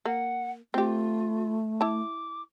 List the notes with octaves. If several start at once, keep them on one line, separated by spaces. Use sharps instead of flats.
A#3 F#5
A3 C4 F4 G4
E4 A5 D6